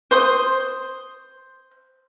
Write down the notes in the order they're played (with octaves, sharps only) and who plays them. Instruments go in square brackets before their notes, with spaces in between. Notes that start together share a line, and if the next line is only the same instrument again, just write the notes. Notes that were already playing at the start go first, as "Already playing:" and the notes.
[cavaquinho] C5 C6 D#6